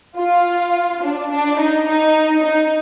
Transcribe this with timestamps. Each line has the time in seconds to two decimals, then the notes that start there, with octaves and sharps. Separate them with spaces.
0.17 F4
1.03 D4
1.31 D4
1.59 D#4
1.88 D#4
2.44 D#4